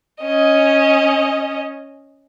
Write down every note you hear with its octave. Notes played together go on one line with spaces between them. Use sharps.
C#4 D#5